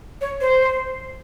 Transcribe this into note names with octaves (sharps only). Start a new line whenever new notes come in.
C#5
C5